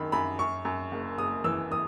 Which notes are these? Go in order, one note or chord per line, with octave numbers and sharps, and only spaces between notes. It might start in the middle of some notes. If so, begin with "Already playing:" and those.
Already playing: F#2 D#3 B5
F#2 B5
F#2 C#6
F#2
F#1
F#1 D#6
E3 E6
E3 D#6